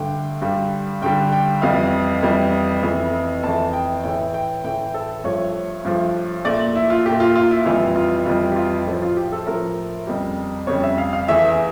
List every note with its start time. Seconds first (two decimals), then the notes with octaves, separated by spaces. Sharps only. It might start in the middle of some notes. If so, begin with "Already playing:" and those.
Already playing: G2 D3 A3 G5
0.41 G2 D3 G3
1.02 G2 D3 G3 G5
1.32 G5
1.62 F2 E3 G3 F5
2.23 F2 E3 G3
2.83 F2 E3 A3
3.43 F2 E3 A3 A5
3.73 G5
4.04 A2 E3 A3 G5
4.34 G5
4.64 A2 E3 A3 G5
4.94 A4
5.24 G2 F3 A3 C#5
5.85 G2 F3 A3
6.45 A#2 A3 D5
6.75 E4
6.90 F4
7.06 A#2 A3 G4
7.20 F4
7.36 F4
7.51 E4
7.65 F2 E3 G3 F4
7.96 F4
8.26 F2 E3 G3 F4
8.52 G4
8.56 F4
8.87 A2 F3 A3 E4
9.02 F4
9.17 G4
9.32 A4
9.47 A2 F3 A3 A#4
10.07 F2 C#3 G3
10.67 F2 C#3 G3 C#5
10.83 E5
10.98 F5
11.13 F5
11.28 E2 E3 A3 E5